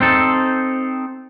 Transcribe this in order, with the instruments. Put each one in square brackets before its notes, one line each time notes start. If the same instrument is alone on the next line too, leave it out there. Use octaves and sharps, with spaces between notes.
[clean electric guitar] C4 D#4 A4